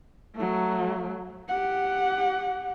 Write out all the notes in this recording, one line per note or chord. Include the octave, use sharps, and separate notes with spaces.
F#3 A3
G4 F#5